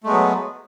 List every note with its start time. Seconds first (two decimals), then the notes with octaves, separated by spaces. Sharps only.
0.04 A3
0.06 G#3
0.09 B3
0.12 F#3